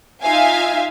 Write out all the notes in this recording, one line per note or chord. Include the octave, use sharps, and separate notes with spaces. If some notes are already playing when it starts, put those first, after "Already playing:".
D#4 F4 E5 F5 G#5